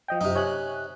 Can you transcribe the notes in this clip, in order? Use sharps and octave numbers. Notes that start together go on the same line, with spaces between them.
F3 D#5 G5
F#2 C3 D#4
C#5 G#5 F#6